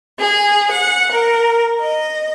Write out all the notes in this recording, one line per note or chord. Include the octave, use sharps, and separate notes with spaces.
G#4
F#5
A#4
D#5